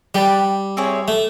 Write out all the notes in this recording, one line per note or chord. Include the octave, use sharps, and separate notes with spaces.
G3 G4 B4 D5
C4 E4 G#4 C#5
A3